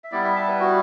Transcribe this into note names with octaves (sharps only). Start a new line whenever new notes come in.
E5
G3 B3 E4 D5
E5
A5
B4
F#4